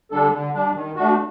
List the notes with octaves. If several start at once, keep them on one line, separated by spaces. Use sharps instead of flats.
D3 G3 D4 A4
D3
G3 D4
D#3
A3 D4 F#4